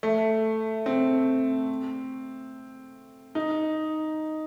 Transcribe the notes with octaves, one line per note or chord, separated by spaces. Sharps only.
A3
C4
D#4